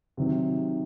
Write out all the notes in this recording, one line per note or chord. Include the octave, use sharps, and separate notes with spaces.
C3 D#3 F#3 C4 D#4